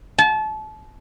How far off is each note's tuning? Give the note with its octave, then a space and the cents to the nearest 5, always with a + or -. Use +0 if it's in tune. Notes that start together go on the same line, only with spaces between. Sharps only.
A5 -30